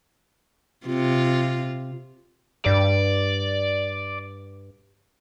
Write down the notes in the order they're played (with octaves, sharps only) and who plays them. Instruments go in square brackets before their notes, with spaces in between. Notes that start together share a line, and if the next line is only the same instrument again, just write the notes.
[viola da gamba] C3 F4
[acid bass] G2 [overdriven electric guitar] D5